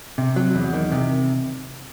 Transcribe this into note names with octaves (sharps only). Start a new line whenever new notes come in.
C3
F#3
E2
D#3
C3